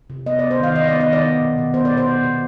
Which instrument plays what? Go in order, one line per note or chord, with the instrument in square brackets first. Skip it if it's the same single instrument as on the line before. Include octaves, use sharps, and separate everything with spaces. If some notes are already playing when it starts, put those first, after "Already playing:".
[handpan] C3
B3 D#5
D5
B3
C5
D#3 F5
D#3 D#5
D5
B3
D#5
D#3 D5
B3
B2
B2
B3 C5
D5
B2
C5
B2
B2